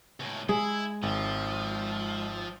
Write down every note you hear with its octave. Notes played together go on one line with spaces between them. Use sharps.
C#2 A2
G#3 E4 G#4
G#1 F3